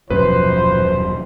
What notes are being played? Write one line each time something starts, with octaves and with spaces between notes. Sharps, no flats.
D#1 F#2 B2 F3 F#3 B4 C5